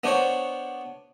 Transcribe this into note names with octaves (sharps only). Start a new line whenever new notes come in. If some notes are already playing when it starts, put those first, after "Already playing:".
B3 D4 C5 C#5